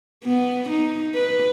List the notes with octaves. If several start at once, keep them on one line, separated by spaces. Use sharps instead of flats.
B3
D#4
B4